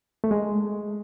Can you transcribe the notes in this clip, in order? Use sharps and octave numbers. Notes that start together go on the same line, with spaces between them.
A3
G#3